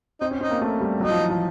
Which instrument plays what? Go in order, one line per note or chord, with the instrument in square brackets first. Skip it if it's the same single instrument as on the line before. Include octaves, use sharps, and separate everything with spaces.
[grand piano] C4 [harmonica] D#4
[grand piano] C#4
[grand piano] C4 [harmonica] D#4
[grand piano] A#3
A3
G3
[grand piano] F#3 [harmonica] D#4
[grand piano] F3
E3
F3